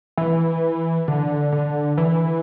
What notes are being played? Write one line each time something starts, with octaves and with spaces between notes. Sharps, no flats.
E3
D3
D3
E3